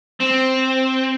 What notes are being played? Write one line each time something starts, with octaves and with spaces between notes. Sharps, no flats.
C4